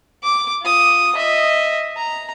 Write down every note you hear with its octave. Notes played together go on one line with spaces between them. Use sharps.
D6
F4 D#6
D#5 E5
A#5